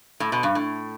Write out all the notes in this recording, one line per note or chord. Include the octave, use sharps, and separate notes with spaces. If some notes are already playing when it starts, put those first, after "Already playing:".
A2
B2
G2
A2